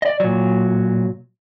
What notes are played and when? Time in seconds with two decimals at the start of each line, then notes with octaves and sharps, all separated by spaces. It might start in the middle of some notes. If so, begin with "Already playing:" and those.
0.02 D5 D#5
0.20 A#2 F#3